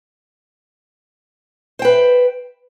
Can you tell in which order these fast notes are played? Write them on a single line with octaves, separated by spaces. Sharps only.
C5 G5 B4